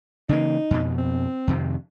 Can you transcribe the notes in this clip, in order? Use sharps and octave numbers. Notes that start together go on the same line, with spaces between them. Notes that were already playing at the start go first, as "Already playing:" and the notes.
C#3 E3 A#3 D#4
F2 B2
C4
F2 C3 D#3